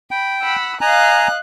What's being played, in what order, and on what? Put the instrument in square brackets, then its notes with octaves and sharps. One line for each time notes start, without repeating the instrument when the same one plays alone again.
[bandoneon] G5 [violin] B5
[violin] F#5 [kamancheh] B5 E6
[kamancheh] D#5 F5 [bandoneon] G#5 A#5 [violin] F#6